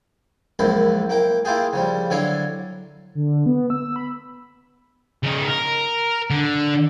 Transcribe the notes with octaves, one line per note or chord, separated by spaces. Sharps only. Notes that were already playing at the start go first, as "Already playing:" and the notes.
C#2 F#2 A#2 F3 E4 B5
A#3 E4 G5
A#3 E4 F4 G4 G#4
C#3 F3 G3
D3 F#3 E4 C#5 D5 F5
D3
B3
E6
B5
C#3 D#4
A#4
D3